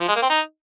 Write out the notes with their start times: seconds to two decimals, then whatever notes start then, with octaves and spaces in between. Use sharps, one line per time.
0.01 F3
0.08 G#3
0.16 A#3
0.22 C4
0.30 D#4